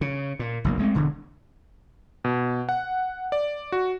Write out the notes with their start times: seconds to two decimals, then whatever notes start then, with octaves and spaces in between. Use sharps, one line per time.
0.01 C#3
0.39 A#2
0.64 F#1 B1 A#3
0.79 G#3 A3 C4
0.95 E1 D3
2.24 B2
2.69 F#5
3.32 D5
3.72 F#4